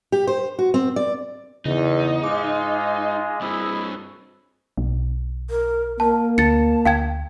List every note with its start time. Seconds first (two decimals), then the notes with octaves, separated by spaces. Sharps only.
0.12 G4
0.27 C5
0.59 F#4
0.74 C4
0.96 D5
1.65 E2 C#3 D#4
2.24 G#2 G#3 F4 D6
3.41 G2 C4 E4 G#4
4.77 B1
5.50 A#4
6.00 A#3 A#4 A5
6.38 D2 A5 A6 C#7
6.86 D2 F5 G5 G#6